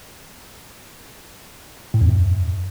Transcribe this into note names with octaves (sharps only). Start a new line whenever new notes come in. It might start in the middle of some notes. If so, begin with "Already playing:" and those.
A2
E2
F#2